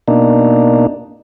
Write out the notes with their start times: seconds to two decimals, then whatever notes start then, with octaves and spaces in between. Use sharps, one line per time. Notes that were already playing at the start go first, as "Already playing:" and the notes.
0.08 B2 A#3 D4 D#4